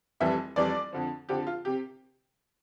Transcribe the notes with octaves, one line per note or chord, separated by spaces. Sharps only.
F1 F2 E3 G3 E5
F1 F2 E3 G3 D5
F2 D3 F3
F2 D3 F3 G4
F4
C3 G4